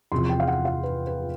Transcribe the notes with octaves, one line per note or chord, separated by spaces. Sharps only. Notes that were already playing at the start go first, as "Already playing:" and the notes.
E2 C3 F3 C6
G5
F5
F#5
F5
B4
B4